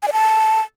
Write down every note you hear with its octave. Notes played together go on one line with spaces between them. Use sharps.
G#5
D5
A5